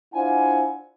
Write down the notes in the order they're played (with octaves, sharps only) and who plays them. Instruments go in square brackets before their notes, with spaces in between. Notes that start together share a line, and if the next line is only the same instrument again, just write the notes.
[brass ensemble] D4 E4 F4 C5 F#5 G#5